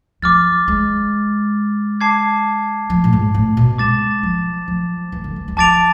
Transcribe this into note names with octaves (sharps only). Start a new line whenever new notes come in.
F3 D6 F6 A6
G#3
A5 D6 G#6 C7
F3
A2
G#2
A2
B2
G#3 D6 A6 E7
F3
F3
E3
D3
E3
G#3
F3 A5 D6 A6 D7 F7